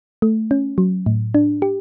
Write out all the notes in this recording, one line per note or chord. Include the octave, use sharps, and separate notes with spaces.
A3
C#4
F#3
A2
D4
G4